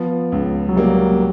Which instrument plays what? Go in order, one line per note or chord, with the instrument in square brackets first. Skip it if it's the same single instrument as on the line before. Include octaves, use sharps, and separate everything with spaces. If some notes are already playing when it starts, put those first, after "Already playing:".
Already playing: [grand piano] F3 [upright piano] B3
[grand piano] C#2
[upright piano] F#3
[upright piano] G3 [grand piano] A#3